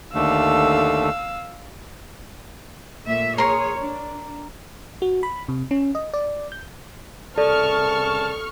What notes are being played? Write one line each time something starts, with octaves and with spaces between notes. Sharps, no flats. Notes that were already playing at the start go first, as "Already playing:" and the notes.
D#2 D3 A3 F5 E6
A#2 A3 E5
G#4 A#4 C#5 C6
D4
F#4
B5
C3
C#4
D#5
D5
G6
C2 C#3 A4 D5 A5 C#6 F6